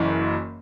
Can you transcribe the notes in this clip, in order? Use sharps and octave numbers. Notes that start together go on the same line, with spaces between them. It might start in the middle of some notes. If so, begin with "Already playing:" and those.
Already playing: F#1 F#2 E3